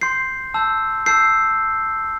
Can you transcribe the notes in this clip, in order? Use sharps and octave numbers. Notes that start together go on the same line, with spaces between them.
C6 G6 C7
A5 E6 G6
A5 E6 G6 C7